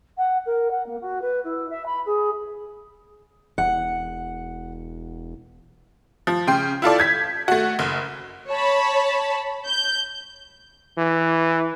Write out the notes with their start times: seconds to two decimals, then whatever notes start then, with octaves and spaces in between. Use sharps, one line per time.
0.17 F#5
0.45 A#4
0.70 F#5
0.85 A#3
1.00 F#4
1.21 B4
1.44 E4
1.69 E5
1.85 B5
2.05 G#4
3.58 E1 F#5
6.27 F3
6.47 C#3 G5 C6
6.82 E4 F4 A4 D5
6.98 G6 G#6 B6
7.48 A3 F#4
7.79 F#1
8.50 C#5 A5 B5
9.66 G6
10.98 E3